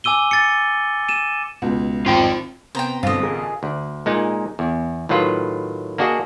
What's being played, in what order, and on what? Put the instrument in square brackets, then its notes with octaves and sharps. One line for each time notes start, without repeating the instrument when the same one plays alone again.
[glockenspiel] G#5 D6 E6 D#7 G7
A6 C#7
D#7 E7
[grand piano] C#2 B2
[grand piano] G#1 [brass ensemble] C4 [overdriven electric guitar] F4 G5
[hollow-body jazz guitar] C3 [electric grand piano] B3 A#5 [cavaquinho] C5 G5
[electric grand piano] A1 B2 D3 [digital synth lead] G2 [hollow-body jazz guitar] C4 [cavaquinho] F4 D#5
[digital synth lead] G#4 [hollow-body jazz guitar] A#4
[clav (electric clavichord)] D2
A#2 G#3 D#4
E2
A2 D#3 F#3 F4 B4
A#3 D4 F#4 G#4 D#5